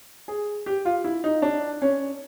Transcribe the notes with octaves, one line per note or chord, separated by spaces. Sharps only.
G#4
G4
F4
E4
D#4
D4
C#4